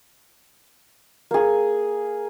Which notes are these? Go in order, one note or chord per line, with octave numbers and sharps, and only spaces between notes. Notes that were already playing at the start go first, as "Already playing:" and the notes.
A#3 G#4